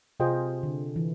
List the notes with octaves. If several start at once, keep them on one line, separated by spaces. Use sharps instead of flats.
C3 F4 G#4 C5 D#5 G5
D3
E3